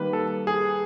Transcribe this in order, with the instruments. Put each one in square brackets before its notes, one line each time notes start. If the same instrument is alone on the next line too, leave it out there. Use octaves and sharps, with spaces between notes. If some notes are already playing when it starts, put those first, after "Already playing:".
Already playing: [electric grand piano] D#3 G3 A#3 B4
A4
G#4